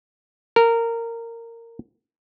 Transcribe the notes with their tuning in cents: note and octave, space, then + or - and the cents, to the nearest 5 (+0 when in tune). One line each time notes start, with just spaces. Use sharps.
A#4 -15